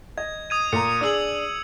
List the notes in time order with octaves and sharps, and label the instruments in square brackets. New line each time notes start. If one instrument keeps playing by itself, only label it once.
[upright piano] D#5 [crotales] G#6
[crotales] D#6 G#6 D#7
[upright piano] A#2 A#5 [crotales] C#7
[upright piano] D4 G#4 [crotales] D#6 E6 F#7